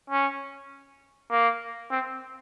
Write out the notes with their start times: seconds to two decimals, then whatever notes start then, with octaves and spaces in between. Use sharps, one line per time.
0.10 C#4
1.31 A#3
1.91 C4